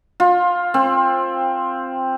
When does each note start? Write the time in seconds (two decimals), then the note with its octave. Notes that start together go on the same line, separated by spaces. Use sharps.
0.20 F4
0.74 C4